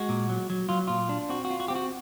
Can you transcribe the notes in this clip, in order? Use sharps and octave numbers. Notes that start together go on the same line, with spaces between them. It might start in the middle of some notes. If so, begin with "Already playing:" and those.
Already playing: G#3 F#4
A#2
F#3
F#3
F#3 F4
A#2 F4
D4
C4 F#4
F#4
F4
F#4
C4 G4
F#4